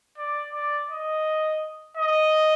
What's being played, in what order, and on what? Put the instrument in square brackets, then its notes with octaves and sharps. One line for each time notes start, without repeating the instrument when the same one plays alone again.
[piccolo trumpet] D5
D5
D#5
D#5